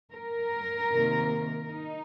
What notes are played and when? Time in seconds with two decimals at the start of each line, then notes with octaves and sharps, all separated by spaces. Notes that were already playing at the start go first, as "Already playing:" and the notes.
0.14 A#4
0.91 C3 D#3 A#3
1.68 D#4